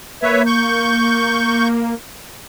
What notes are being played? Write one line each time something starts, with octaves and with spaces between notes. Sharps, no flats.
A#3 B4 C#5 E5
C#6 G6